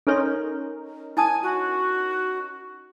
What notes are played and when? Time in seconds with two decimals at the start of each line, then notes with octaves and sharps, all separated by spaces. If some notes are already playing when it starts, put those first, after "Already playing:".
0.07 C#4 D#4 A4 A#4 C#5 C6
1.17 E4 G#5 A5 D#6
1.43 F#4